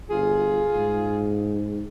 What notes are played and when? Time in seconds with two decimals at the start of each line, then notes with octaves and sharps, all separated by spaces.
0.11 G1 F4 G#4
0.76 G#2